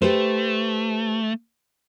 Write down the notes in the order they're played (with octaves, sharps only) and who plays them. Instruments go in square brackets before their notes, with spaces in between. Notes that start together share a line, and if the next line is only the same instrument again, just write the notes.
[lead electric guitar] A3 [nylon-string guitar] G4 B4 C5